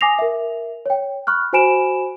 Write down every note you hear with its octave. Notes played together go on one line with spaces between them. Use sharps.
G#5 D6 D#6 A#6 C7 F7
A#4 E5
C#5 G5
B5 C#6 F6 F#6
F#4 C5 G#5 B5 D7 E7